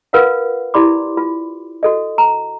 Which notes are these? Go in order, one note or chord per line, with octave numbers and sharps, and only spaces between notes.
F4 A#4 B4 F5 F#5
E4 G4 D5 B5 C6 D6
F4
F#4 A4 D#5
A#5